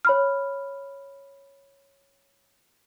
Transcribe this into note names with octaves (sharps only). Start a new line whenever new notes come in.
C#5 B5 F6